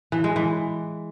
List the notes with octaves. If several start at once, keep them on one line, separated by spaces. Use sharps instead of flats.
E3
G#3
E3